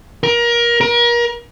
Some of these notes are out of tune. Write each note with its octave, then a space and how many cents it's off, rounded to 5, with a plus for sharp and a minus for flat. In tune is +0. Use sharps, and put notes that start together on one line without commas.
A#4 +25
A#4 +35